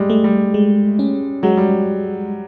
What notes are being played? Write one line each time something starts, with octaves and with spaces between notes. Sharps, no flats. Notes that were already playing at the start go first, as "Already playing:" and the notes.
Already playing: G3 G#3
A3
G3
G#3
C#4
F#3 G#3
G3